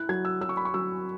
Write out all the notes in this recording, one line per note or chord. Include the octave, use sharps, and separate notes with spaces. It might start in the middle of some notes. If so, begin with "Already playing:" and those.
Already playing: E4 F#6
F#3 G#6
E6
F#3 E6
C#6
B5
C#6
F#3 E6